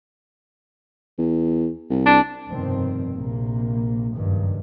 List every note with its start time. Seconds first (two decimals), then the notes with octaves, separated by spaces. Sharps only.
1.18 E2
1.90 C2
2.06 D4
2.50 F1 G2 B2 D#3 C4
3.14 A#1 C3 A#3
4.14 F#1 C#2 G2 D#3